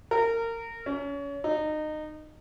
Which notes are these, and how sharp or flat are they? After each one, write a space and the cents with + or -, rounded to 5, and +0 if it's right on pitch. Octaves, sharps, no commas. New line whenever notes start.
A#4 -25
C#4 +30
D#4 -25